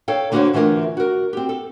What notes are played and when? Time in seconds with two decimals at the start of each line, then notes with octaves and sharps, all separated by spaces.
0.08 A4 C#5 F5 G5
0.32 D3 A#3 F#4 A4 C5 C#5
0.53 D3 E3 A3 F4 A#4
0.97 F#4 A#4
1.33 C4 G4
1.49 A4